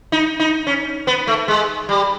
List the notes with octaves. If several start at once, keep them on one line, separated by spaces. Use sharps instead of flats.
D#4
D#4
C#4
B3
A3
G#3
G3